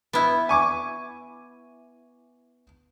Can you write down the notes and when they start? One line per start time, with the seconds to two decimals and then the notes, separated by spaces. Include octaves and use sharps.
0.13 B3 E4
0.49 G#5 C#6 D6